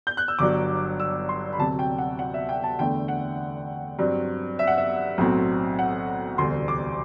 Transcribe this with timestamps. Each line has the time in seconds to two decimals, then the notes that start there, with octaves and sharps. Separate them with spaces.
0.07 G6
0.17 F#6
0.28 E6
0.39 G1 G2 F#3 D6
1.00 E6
1.29 C6
1.53 B5
1.58 D2 C3 F#3 A5
1.79 G5
1.98 F#5
2.19 F#5
2.34 E5
2.49 G5
2.64 A5
2.79 E2 D3 A3 G5
3.08 F#5
3.99 G2 F#3 C4
4.59 E5
4.67 F#5
4.78 E5
5.18 B1 A2 F#3 C4
5.79 F#5
6.38 E1 D2 C3 G3 C4 C6
6.68 D6